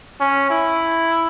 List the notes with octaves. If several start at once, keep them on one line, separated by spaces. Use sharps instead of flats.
C#4
E4